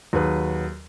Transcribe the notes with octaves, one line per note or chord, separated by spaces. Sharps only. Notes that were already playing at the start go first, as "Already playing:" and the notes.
D#2 F#3 G#4 B4